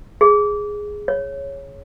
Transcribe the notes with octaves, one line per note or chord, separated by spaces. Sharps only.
G#4
C#5